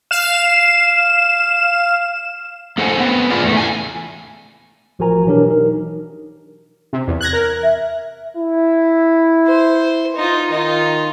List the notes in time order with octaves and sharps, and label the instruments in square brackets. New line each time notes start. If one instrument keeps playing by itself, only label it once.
[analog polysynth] F5 E7
[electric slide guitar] A#3 A4 C5 F#5 G#5
B3 C4
F4 G#4 D5
E2 A3
A2 G#5
[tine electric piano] A1 F3 F#4 A#4 G#5 A#5
B2 E3 F#3 D4 G4 A#4
D#4 A#4
[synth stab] C3
E2
F#6 G#6 A#6
A#4
[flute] E5
[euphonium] E4
[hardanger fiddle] C5
D#4 F4
[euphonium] D#3 [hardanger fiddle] D#4 F4